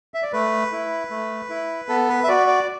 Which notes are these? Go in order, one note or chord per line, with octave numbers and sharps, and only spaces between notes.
E5
D5
A3 B4
E4
A3
E4
B3 A4
B4
E5
F#4 D5
D5